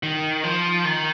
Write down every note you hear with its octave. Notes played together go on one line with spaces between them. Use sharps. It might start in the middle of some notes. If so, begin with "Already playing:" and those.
D#3
F3
D#3